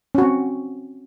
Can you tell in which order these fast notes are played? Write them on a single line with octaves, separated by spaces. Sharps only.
C#4 F#4 C4